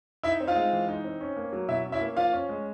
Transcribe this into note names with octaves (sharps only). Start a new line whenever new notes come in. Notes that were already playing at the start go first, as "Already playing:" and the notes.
D#4 E4 E5
C4
F4 F5
G#3
E3
D#4
C4
C#4
A#3
F#3
B2 E4 E5
C#4
E4 E5
A#3
F3 F4 F5
C#4
G#3